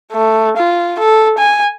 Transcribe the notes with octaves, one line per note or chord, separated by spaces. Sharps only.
A3
F4
A4
G#5